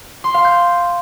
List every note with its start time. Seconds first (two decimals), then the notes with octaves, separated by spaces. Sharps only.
0.24 C6
0.34 F5
0.45 G6